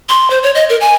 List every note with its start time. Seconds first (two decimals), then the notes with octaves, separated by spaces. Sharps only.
0.09 C6
0.30 C5
0.43 C#5
0.55 D#5
0.70 A#4
0.81 G#5